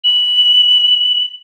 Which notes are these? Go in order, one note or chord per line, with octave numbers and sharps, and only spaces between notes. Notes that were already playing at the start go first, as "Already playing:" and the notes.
F#7